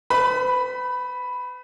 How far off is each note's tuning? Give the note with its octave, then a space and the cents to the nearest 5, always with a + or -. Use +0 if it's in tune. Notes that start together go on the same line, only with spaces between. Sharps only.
B4 +45 B5 +0